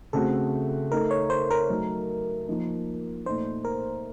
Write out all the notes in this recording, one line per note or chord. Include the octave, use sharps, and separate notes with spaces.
C#3 A3 C4 F#4 A4
A3 D#4 A4 A#4
C#5
C5
A#4
F#3 A3 D#4
F3 A#3 D#4
A#2 A3 D#4 C5
A#4